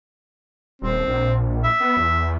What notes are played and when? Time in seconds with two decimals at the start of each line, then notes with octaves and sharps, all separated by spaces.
0.82 D#1 C4
1.07 A#1
1.64 E5
1.80 B3
1.97 E2